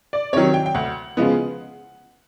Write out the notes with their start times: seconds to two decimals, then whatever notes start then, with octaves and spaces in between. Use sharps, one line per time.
0.13 D5
0.33 C3 D#3 F#3 C#5
0.54 G5
0.66 G5
0.75 D2 F#5
1.17 C#3 F3 G#3 B3